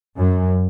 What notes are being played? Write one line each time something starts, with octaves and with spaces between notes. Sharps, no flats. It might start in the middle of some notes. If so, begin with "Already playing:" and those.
F#2